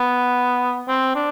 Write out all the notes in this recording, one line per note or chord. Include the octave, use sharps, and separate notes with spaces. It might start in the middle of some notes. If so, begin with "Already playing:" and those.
Already playing: B3
C4
D4